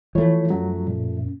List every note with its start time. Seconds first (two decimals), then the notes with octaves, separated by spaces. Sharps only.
0.15 E3 F3 A3 E4 C#5
0.50 F#2 F#3
0.87 A#2